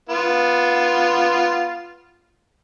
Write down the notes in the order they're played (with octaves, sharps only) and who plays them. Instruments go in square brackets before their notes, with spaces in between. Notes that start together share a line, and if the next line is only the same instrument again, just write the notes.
[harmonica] B3 F4